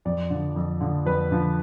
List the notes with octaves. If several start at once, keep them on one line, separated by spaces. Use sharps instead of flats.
F2 D5
D3 F3
F2
D3 F3
F2 B4
D3 F3